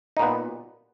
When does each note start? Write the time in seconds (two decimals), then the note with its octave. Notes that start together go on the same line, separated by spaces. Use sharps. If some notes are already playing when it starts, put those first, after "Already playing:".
0.17 D#4
0.19 A#2
0.22 B3